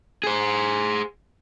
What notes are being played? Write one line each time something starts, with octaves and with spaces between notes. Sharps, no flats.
G#4 C5